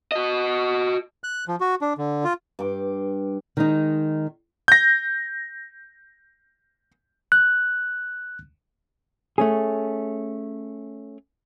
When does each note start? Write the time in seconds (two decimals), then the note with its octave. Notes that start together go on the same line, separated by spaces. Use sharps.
0.12 F#4 D#5
1.24 F#6
1.48 F3
1.60 F#4
1.81 D4
1.98 D3
2.24 F4
2.59 G2 C6 D6
3.57 D#3 G#3 D#4
4.68 G6 A#6
7.32 F#6
9.38 A3 C#4 G#4